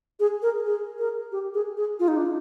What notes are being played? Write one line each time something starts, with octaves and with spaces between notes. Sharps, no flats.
G#4
A#4
G#4
A#4
G4
G#4
G#4
F4
D#4
D4